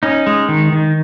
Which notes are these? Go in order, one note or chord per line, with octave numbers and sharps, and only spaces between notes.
C#4 D#4
G#3
D#3
D#3